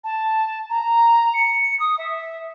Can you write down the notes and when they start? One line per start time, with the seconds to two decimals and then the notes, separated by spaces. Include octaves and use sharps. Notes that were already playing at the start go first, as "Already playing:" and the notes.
0.04 A5
0.70 A#5
1.34 C#7
1.80 D#6
1.98 E5